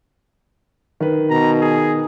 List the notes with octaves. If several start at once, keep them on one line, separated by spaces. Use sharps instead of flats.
D#3 B4
B2 A#5
G#4